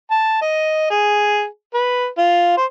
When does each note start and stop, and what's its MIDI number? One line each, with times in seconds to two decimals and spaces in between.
0.11 0.39 81
0.42 0.90 75
0.90 1.45 68
1.74 2.07 71
2.18 2.55 65
2.57 2.65 72